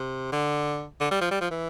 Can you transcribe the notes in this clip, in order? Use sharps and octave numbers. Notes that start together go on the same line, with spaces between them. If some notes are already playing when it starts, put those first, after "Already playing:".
Already playing: C3
D3
D3
G3
F3
G3
F3
E3